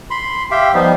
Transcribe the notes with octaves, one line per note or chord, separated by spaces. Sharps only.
B5 C6
G4 E5 F5 G5
F3 G3 B3 D#4